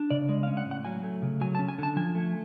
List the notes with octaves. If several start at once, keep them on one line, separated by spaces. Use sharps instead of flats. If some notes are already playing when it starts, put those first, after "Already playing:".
Already playing: D4
C#3 D5
G#3 D5
F5
C#4
F#5
A2
F#5
F#3 G#5
A3
C#3
F#3 G#5
A5
C#4
G#5
D3 A5
F3 G#5
A3